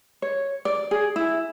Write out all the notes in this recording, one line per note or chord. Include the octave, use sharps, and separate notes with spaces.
C#5
D5
G#4
E4